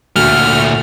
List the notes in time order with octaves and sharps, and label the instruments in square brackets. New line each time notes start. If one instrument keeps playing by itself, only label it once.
[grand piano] D2 F#4 [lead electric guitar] A#2 A3 [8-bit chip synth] F6